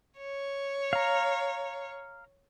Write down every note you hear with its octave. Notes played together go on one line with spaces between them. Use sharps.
C#5
F5 A#5